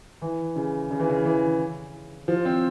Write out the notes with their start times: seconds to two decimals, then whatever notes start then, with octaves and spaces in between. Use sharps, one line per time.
0.22 E3
0.56 C#3
0.91 C#3
1.00 E3
1.09 C#3
1.25 E3
2.28 F3
2.45 C4